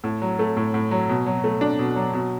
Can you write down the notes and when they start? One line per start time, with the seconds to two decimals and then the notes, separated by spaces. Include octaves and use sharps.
0.04 A2
0.22 F#3
0.39 A3
0.57 A2
0.74 A2
0.91 F#3
1.09 B2
1.26 F#3
1.44 A3
1.61 D4
1.79 B2
1.96 F#3
2.13 B2